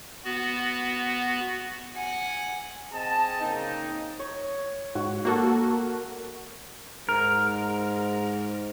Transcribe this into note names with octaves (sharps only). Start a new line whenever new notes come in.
B3 F#4
F#5 G#5
C4 G#4 D#5 A5
C#3 A#3 C4 D#4
C#5
G#2 F#4
A#3 F#4 A4 A#4
G#2 A#4